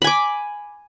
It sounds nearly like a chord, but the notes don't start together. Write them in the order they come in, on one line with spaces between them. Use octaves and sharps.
B5 G#5 D6